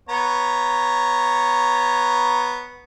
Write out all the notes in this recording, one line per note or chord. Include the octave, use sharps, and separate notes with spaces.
B3 C#5 A#5